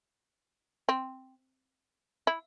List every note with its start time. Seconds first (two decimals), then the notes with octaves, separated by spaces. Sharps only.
0.89 C4
2.27 E4